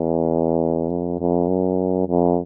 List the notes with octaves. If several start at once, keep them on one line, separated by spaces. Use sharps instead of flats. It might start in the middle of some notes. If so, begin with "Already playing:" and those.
Already playing: E2
F2
F2
F#2
F2